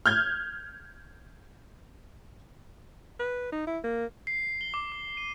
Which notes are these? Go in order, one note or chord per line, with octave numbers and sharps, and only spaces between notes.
F6 G6 G#6
B4
D#4
E4
A#3
C7
G7
D6
D6
D#7